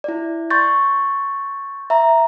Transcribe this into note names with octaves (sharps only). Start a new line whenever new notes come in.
E4 D5
C6 C#6 G6 A6
E5 A#5